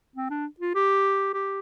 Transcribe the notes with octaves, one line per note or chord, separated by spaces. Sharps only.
C4
D4
F4
G4
G4